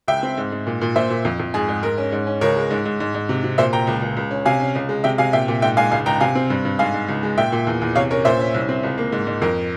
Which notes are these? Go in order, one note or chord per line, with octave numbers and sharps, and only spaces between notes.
C#2 E5 G5
C4
G#2
G#2
A#2
A#2
A#2 C5 E5
A#2
F2
F2
G#2 G#4
G#2
G#2 A#4
C#4
G#2
C#4
C#2 A#4 C#5
G#3
G#2
G#2
G#2
G#2
C3
C3
A#2 C5 E5
A#2 G5 A#5
C#2
C#2
C#2
C#4
C3 F5 G#5
C#4
C#2
G#3
C3 E5 G5
C3 F5 G#5
A#2 E5 G5
A#2
G#2 E5 G5
G#2 F5 G#5
C#2 F5 G#5
C#2 G5 A#5
C3 F5 G#5
C4
G2
G2
G#2 F5 G#5
G#2
C#2
G#3
A#2 E5 G5
A#2
E2
E2
C3 C#5 F5
C#4 A#4 C#5
A#2 C5 E5
C#4
C2
C4
C#2
A#3
G#2
G#2
F2 A#4